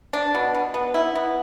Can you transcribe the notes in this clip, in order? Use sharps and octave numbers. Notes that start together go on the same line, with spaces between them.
D4
B2
B2
B3
E4
B3